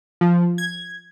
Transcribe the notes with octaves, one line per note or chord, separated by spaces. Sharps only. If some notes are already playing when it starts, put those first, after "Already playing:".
F3
G#6